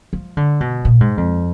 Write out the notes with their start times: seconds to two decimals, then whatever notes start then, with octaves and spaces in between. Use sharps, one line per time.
0.13 F3
0.37 D3
0.61 B2
0.85 A#2
1.01 G#2
1.17 F2